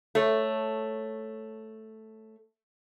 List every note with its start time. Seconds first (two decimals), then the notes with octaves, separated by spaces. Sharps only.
0.15 A3 C#5